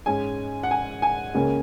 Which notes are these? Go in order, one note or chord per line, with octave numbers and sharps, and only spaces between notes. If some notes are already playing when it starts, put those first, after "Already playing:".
G#2 G#3 C#4 G#5
F#5
G#5
G#5
C#2 C#3 A#3 C#4